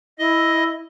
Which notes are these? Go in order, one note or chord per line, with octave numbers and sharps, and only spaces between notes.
E4 D#5